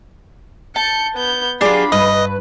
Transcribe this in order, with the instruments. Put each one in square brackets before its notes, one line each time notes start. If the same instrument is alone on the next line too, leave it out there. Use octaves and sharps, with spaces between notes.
[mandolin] A5 [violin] G6 C#7
[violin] B3 G6
[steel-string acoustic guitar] F#3 G4 G#4 [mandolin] D4 F4 [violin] B5
[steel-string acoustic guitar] G2 [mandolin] B4 [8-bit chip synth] D#5